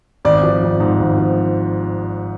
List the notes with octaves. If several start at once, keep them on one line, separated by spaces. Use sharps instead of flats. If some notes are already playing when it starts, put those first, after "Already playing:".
G#1 D5
F3
G#1
G#2
G#1
F3